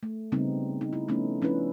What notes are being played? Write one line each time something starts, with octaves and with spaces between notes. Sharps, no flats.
A3
C#3 G3 B3 C4 D#4
D#4
E4
F3 A3 B3 C#4 D#4
F3 C#4 D4 E4 B4